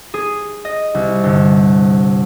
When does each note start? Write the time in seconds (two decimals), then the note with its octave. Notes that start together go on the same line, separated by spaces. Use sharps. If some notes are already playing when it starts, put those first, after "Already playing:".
0.14 G#4
0.65 D#5
0.94 C2
1.24 G1